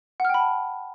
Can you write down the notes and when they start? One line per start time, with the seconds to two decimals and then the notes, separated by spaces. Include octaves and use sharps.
0.20 F#5
0.25 F6
0.29 G5
0.34 B5
0.39 A5